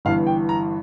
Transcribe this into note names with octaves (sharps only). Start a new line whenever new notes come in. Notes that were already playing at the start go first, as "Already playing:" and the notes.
G1 G2 E3 F5
G5
A#5